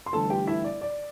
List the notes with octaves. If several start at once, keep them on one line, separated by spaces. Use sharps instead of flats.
C6
G1 G2 E3 A3 A4 A5
G4 G5
E4 E5
D5
D5